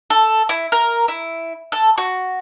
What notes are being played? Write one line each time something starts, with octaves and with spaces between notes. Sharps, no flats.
A4
E4
A#4
E4
A4
F#4